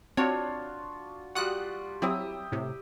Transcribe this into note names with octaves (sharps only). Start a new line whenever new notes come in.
C4 D4 F4 F#4 C#5
G3 F4 F#4 F#5 D#6 F#6
F#3 C4 E4 G4 E5 D#6
A2 C3